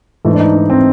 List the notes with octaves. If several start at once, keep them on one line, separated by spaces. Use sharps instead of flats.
G#2 E3 A3
D4
D#4
D4
C4